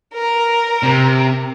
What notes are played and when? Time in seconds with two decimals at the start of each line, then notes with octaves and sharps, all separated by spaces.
0.14 A#4
0.83 C3